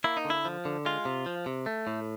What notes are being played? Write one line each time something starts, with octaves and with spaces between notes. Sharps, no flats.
A#3 E4
D#4
D3
E4
F3
D3
G#3 F4
C3
F3
C3
A3
A2